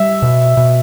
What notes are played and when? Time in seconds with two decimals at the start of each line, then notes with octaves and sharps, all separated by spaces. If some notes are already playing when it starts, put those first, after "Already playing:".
Already playing: G3 E5
0.22 B2
0.57 B2